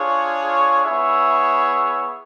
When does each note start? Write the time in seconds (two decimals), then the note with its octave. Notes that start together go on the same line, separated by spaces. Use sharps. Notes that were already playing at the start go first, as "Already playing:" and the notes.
Already playing: D4 F4 G#4 C#5
0.85 B3 E4 G#4 C#5 E5